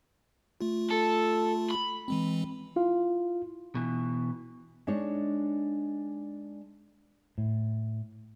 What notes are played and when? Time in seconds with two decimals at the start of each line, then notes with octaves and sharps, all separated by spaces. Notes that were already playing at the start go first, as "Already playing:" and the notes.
0.61 A3 F4
0.90 A4
1.70 B5
2.08 E3 G#3 C4
2.76 E4 F4 F5
3.75 B2 E3
4.87 G#3 D4 D#4 C#5
7.38 A2